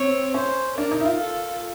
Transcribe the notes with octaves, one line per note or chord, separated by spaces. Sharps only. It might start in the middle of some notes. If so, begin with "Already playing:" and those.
Already playing: C4 C#5
C#4 C5
D4 A#4
D#4
E4
F4
A4